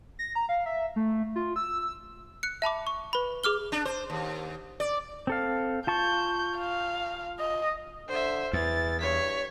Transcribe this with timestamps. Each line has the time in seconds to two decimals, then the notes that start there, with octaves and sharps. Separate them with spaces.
0.19 A#6
0.35 A#5
0.49 F5
0.66 E5
0.96 A3
1.36 F4
1.56 E6
2.43 F#6 C#7
2.62 E5 A5 B5 D6
2.87 C#6
3.13 B4 B5
3.44 G#4 D6 F6 G7
3.72 D4
3.85 C5
4.10 D#2
4.80 D5
5.27 C4 A4 F5
5.87 F4 A5 C#6 G6
6.58 F5
7.39 D#5
8.09 D3 C5 E5
8.53 E2 E3 A6
9.01 G2 C#5 B6